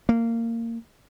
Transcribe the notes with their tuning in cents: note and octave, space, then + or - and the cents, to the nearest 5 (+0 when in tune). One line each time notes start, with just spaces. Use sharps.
A#3 -20